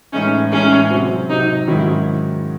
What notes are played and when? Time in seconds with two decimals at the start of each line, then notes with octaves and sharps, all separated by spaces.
0.13 A2 E3 G#3 C#4 D#4
0.51 A2 E3 G#3 C#4 D#4
0.91 C3 F#3 C4
1.29 C3 F#3 C4 D#4
1.68 G#2 D#3 F#3 C#4 E4